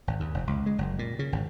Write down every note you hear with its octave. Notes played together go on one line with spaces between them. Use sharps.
G#1
D#2
F1
C#2
G#3
F#1
A#2
C#3
G#1